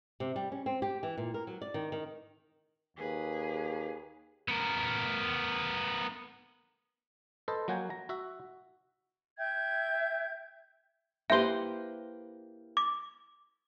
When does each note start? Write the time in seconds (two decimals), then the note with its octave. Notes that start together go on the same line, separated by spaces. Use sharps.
0.20 C3
0.36 G3
0.52 C#4
0.66 C4
0.82 G4
1.03 E3
1.17 A#2
1.34 A#4
1.47 F#3
1.62 D5
1.74 D#3
1.92 D#3
2.97 D#2 G#4 B4
4.48 B3 A#4
7.48 A4 B4 C5 D#5
7.68 F#3 A#3 F#4 G5 G#5
7.90 A#5
8.09 F#4 E5
9.38 E5 G5 G6 G#6
11.30 A#3 E4 G4 B4 C5 E5 G5 G7
12.77 D6